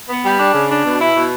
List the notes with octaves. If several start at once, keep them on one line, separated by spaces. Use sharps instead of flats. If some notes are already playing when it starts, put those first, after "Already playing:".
B3
G3
D4
C#3
D4
B2
E4
B2